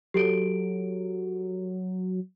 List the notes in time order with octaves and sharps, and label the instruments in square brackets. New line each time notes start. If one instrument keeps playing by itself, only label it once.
[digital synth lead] F#3 [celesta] G4 A4 D7